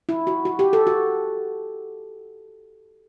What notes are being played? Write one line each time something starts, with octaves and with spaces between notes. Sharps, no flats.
E4
F#4
F#4
G4
A4
F#4